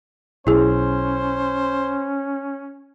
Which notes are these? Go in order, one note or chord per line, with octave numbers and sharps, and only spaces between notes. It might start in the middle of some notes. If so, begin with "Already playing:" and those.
B1 C#4 E4 G#4 C5